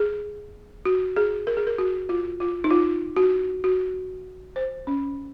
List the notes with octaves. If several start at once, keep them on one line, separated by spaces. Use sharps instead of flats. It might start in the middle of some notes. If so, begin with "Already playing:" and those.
Already playing: G#4
F#4
G#4
A#4
G#4
A#4
F#4
F4
F4
D#4
F4
F#4
F#4
C5
C#4